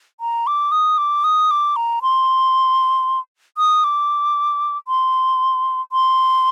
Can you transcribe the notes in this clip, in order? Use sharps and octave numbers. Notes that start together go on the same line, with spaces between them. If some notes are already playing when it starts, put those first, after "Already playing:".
A#5
D6
D#6
D6
D#6
D6
A#5
C6
D#6
D6
C6
C6